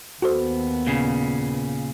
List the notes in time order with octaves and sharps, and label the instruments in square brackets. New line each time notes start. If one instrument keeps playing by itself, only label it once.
[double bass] D#2 B3 [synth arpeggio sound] F#4 A4 C5
[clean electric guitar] A#2 C#3